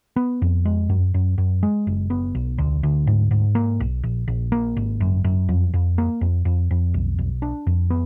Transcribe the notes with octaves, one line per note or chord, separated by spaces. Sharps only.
B3
F2
G#3
F#2
F#2
F#2
G#3
F#1
B3
B1
D2
D2
G#2
G#2
A#3
B1
A#1
A#1
A#3
G#1
F#2
F#2
F2
F2
A#3
F2
F2
F2
B1
B1
D4
F2
B3